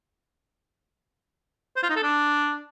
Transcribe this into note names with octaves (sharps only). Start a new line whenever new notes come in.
C5
F4
D#4
A4
D4